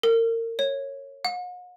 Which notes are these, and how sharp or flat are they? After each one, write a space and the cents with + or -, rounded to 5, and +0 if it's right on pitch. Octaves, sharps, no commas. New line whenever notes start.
A#4 -30
C#5 -10
F#5 -45